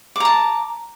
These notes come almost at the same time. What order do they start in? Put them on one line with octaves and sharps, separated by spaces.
D6 A#5 A5